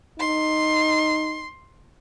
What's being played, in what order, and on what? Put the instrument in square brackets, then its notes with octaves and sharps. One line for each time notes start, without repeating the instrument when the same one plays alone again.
[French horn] D#4 [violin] C6